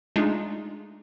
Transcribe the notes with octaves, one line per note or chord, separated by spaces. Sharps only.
G#3 A3 D4 D#4 F4 G#4